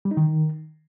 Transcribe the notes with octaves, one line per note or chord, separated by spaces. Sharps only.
G3
D#4
D#3